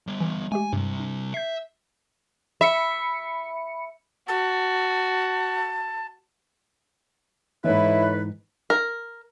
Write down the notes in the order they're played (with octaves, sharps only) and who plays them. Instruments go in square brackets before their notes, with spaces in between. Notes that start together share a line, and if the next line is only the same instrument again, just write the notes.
[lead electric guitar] G3 B3
[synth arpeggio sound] E3
[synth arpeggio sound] G#3 A3 G4 [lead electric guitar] G#5
[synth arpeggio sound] G2 [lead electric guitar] C3 G3
[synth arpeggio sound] D4
[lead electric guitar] E5 [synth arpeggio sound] G6 C7
[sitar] E5 [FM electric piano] B5 C#7
[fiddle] F#4 [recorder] A5
[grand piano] G#2 E3 [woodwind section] D#4 A4 B4 [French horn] E4 [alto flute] C#5
[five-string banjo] A#4